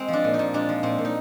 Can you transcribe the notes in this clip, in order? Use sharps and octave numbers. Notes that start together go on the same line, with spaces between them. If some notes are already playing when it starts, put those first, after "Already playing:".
Already playing: G#3 C4
F3 D4
A#2
D#4
A#2
G#3 D4
F3
A#2 C4
A#2
D#4